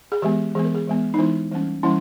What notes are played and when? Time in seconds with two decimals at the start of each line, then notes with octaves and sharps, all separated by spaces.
0.12 G#4
0.22 E3 G#3 B3 G4
0.55 E3 G#3 B3 G#4
0.65 A#4
0.75 G#4
0.87 E3 G#3 B3
1.14 D#4
1.19 E3 G#3 B3 E4
1.51 E3 G3 A#3 C#4
1.83 E3 G3 A#3 C#4 E4